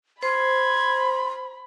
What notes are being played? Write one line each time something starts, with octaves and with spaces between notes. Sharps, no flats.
C5 B5 C6 G#6